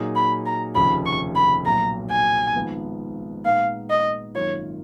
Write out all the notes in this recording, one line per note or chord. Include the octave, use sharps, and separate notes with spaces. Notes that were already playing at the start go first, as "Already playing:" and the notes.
Already playing: A#2 F#3 A#3 D#4 G#4
B5
A#5
F1 D#2 C#3 F3 B5
C#6
B5
B1 A#2 F#3 A#5
G#5
G#1 G#2 F3 B3
A#2 G#3 B3 D#4 F5
D#5
G#1 F#2 D#3 A#3 F4 C#5